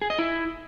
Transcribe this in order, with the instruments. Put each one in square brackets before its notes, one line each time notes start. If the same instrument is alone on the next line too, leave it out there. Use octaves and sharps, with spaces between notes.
[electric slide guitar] G#4
D#5
E4